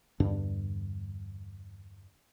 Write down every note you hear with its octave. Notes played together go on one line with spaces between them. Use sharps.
E2 G2 D3 D4